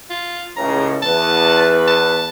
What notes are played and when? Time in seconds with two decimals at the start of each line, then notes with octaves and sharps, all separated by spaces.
0.10 F4
0.57 C#2 A2 C#3 A#5
1.02 E2 B4 A5
1.88 A5